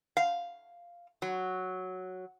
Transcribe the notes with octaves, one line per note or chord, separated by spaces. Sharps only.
F5
F#3